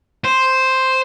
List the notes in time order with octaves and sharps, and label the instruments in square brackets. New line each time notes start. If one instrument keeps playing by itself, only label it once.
[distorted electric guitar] C5